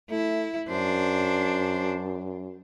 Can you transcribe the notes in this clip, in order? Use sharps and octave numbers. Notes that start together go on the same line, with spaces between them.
A3 E4
F#2 D4 C5